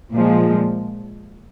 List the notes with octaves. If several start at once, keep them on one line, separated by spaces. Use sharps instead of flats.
A#2 F3 G#3